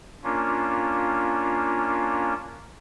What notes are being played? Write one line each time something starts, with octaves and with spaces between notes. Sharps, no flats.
A#3 C#4 D4 F4